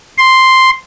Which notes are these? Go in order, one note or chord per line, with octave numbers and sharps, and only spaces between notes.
C6